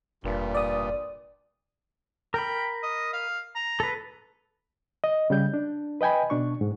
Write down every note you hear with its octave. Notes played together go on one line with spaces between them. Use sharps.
F1 G2 A#2
D5 D#6
A#4 G5 B5
D#5
F5
A#5
A4 B4
D#5
C#3 G3 G6
D4
B4 D#5 G5 G#5 B5
B2 D4 C#6
G#2